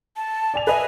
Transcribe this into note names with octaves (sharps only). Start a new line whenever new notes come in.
A5
D5 G#5 F7
B4 D#5 E5 G#5